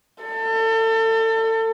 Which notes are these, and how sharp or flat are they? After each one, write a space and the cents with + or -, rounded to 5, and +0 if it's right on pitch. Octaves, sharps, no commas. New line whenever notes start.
A4 +30